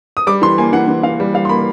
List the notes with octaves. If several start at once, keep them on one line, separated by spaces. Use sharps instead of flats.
D#6
G3 D6
E3 C6
A#3 G#5
E3 F#5
E3
E3 F5
G3
G3 F5
C6
A#3 B5